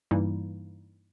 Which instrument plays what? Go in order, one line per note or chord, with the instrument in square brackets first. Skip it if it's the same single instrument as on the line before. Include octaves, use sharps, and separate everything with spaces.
[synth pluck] G2 E3 G3 A#3 D#4 E4